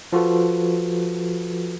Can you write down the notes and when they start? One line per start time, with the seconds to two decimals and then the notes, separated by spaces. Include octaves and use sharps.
0.13 F3 F4 F#4 A4 B4